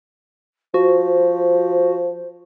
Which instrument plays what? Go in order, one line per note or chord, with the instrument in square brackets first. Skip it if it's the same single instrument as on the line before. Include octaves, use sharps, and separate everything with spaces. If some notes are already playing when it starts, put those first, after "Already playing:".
[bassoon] F3 [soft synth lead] F#4 [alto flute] C5